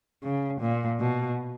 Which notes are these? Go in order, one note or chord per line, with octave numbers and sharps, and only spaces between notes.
C#3
A#2
B2